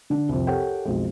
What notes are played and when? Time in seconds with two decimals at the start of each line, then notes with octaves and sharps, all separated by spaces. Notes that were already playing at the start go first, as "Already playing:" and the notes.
0.10 D3 D4
0.29 C2 F2
0.47 G4 A4 A#4 C#5 F#5 G5
0.85 B1 F2 G#3